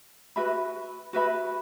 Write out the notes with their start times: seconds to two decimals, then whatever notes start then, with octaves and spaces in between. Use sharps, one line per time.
0.36 F#4 B4 E5 B5
1.13 F#4 B4 E5 B5